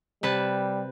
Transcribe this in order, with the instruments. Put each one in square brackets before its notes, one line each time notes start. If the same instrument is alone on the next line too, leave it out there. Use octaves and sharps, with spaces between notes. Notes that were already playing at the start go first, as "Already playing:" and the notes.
[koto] C3 B4 A5 [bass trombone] G3